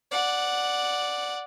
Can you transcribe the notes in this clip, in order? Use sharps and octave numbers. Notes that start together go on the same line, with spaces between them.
D5 F#5